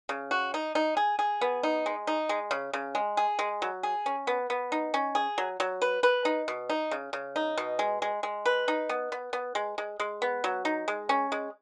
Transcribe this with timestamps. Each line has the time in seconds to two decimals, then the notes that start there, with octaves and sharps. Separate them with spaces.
0.09 C#3
0.31 F#4
0.54 D#4
0.75 D#4
0.97 G#4
1.19 G#4
1.41 B3
1.63 D#4
1.86 G#3
2.07 D#4
2.29 G#3
2.51 C#3
2.73 C#3
2.95 G#3
3.17 G#4
3.39 G#3
3.62 F#3
3.83 G#4
4.06 C#4
4.27 B3
4.50 B3
4.72 D#4
4.94 C#4
5.15 G#4
5.38 F#3
5.60 F#3
5.82 B4
6.03 B4
6.25 D#4
6.48 B2
6.69 D#4
6.91 C#3
7.13 C#3
7.36 D#4
7.57 B2
7.79 G#3
8.02 G#3
8.23 G#3
8.46 B4
8.68 D#4
8.89 B3
9.12 B3
9.33 B3
9.55 G#3
9.78 G#3
10.00 G#3
10.22 B3
10.44 F#3
10.65 D#4
10.88 G#3
11.09 C#4
11.32 G#3